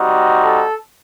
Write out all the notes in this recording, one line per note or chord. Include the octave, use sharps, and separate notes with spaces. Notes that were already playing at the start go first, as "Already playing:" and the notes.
Already playing: G3 C4 D#4 F#4
A4